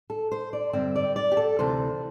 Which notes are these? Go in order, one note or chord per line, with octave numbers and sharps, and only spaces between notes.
A4
C5
D5
G2 D3 C4 E5
D5
D5
G4
A4
D2 C3 E3 C5